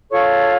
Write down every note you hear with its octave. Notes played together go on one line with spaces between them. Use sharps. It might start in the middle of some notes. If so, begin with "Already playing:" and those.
F4 A4 C#5 C#6